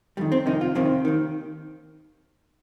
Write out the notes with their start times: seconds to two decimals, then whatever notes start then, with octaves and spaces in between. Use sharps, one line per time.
0.17 F2 D#3 G3
0.32 C4
0.46 F2 C3 D#3 D#4
0.61 F4
0.75 F2 C3 D#3 C4
1.05 D#2 D#3